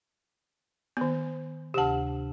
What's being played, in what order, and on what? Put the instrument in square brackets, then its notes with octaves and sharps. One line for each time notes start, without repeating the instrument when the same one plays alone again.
[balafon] D#3 B3
[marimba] D2 C3 [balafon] G4 A5